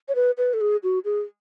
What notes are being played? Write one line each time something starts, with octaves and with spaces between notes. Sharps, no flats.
C#5
B4
B4
A4
G#4
F#4
G#4